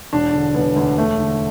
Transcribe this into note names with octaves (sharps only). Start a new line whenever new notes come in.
E1 D4
D3
E1 B3
D2
E1 A3
D3